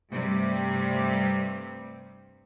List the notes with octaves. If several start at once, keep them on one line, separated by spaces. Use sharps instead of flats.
G2 C3 G3 A3